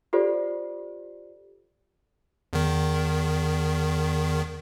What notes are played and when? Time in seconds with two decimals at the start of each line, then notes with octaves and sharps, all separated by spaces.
0.13 F4 G4 A4 C5 D5
2.53 E2 D#3